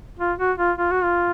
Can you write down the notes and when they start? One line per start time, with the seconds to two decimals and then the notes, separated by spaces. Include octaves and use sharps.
0.19 F4
0.39 F#4
0.58 F4
0.78 F4
0.91 F#4
1.03 F4